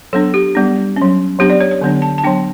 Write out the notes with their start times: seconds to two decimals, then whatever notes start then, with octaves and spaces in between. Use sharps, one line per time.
0.13 F#3 B3 D4 A4
0.34 G4
0.55 G3 B3 D4
0.96 C#4
1.02 F#3
1.39 F#3 B3 D4 G4
1.50 D5
1.60 C#5
1.71 C#5
1.81 D3 F#3 B3 D4
2.02 A5
2.18 A5
2.24 F#3 B3 D4 G5